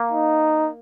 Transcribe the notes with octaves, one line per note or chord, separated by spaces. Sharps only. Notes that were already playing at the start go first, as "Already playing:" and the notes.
Already playing: A#3
D#4